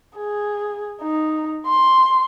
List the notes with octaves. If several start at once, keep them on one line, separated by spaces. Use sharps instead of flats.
G#4
D#4
C6